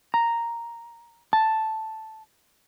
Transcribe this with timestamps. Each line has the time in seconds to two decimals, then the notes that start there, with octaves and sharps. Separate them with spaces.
0.14 A#5
1.33 A5